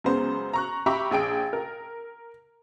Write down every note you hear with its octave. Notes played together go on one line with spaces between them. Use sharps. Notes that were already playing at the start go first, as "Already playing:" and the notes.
F#2 C#3 G#3 B3 C5
A#5 C#6 F#6
G4 E5 A#5 B5 C#6 D6
A#1 G#4 G5 D7
A#4